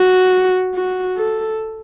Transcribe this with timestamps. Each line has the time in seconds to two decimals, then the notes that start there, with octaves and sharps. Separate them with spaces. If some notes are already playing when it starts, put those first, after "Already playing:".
Already playing: F#4
0.74 F#4
1.17 A4